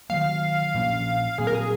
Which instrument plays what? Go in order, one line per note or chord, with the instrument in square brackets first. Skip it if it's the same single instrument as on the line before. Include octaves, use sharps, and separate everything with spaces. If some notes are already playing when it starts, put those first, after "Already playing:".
[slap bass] D#3 F#3 A#3 [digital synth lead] F5
[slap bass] A#2 F3 A#3 C#4
[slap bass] A#2 F#3 C4 [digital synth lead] G#4
[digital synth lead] A#4
G#4